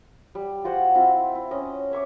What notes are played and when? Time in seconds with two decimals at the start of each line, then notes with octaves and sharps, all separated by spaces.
0.35 G3
0.64 F4 F#4 C5 F#5
0.94 C4 E4 F4
1.35 E4
1.51 C#4 D#5
1.91 C#5 E5 C#6 D6